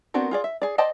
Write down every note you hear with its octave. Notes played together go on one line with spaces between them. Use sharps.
B3 C4 D4 F#4 A#4
F4 G#4 D5
E5
G#4 D5
C5 D5 D#5 G5 A5